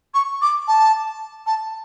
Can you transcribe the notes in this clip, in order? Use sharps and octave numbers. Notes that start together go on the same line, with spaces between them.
C#6
D6
A5
A5